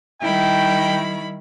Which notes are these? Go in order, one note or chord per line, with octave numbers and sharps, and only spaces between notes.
D#3 G3 E4 G5 B5